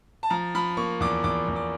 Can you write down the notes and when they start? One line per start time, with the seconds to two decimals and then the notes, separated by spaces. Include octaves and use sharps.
0.23 A5
0.30 F3 A#5
0.55 F3 B5
0.77 A#3 C#6
1.00 E2 D6
1.24 E2 D6
1.48 E2
1.56 D6